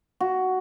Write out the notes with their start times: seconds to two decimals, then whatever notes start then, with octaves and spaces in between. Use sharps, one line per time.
0.21 F#4